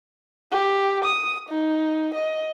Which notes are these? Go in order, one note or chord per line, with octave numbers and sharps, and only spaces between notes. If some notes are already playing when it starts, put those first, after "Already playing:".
G4
D#6
D#4
D#5